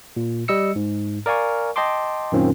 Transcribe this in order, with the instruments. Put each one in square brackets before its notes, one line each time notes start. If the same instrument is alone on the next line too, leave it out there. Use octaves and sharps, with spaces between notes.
[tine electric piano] A#2
G3 D#5 E6 C#7
G#2
A#4 D5 F5 G#5 C#6
D#5 G5 A5 C6 D6
F#2 A#2 D#3 C4 C#4 F4